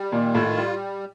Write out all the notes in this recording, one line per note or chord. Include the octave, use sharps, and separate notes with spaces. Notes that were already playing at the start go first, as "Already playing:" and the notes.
Already playing: G3
A#2 D#3
A2 F4
G3